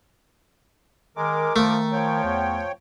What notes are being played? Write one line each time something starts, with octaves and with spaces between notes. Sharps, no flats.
D#3 G#3 A#4 D6
D#3 F3 A3
F3 C#5 G5
E2